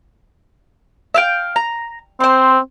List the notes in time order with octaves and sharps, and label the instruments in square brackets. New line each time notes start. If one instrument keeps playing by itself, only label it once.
[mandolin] E5 F5 G5
A#5
[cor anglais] C4 [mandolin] C5 C6